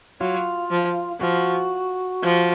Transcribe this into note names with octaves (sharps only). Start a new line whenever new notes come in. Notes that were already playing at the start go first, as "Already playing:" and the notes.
F#3 F4
F3
F3 F#4
F3